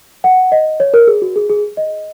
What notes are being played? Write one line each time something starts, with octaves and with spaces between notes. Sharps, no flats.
F#5
D#5
C#5
A#4
G#4
F#4
G#4
G#4
D#5